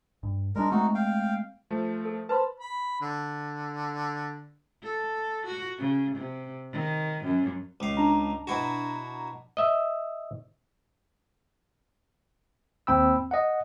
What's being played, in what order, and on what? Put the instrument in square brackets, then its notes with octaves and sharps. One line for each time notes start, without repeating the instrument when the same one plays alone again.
[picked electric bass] G2
[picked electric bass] G3 D4 [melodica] G#3 A#4
[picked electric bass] G#3 A3 C4 [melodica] D#4 F#4
[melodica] F5 G5
[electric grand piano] F3 A3
[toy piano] A4
[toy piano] B4 C5 C6 [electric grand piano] A5 B5
[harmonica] B5
D3
[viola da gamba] A4
F#4
C#3
C3
D#3
F#2
[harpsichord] C#2 F5
[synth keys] D4 A#5
[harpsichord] B2 E4 F#4
[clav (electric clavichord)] D#5 E5
[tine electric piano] D#2 C4 G5 B5 E6
D#5 F#5